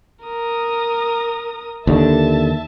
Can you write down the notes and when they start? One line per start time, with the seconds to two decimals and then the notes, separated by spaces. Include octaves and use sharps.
0.24 A#4 D#6
1.87 D#2 D3 E5 A5